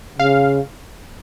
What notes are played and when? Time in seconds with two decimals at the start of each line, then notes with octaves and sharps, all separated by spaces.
0.19 C#3 F5